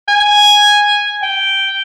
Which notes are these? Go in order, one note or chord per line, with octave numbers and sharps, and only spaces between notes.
G#5
G5